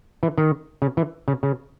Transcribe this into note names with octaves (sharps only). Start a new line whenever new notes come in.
E3
D#3
C#3
E3
C#3
C#3